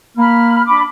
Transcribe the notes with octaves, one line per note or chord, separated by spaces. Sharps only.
A#3 B5 F6
D4 B5 D6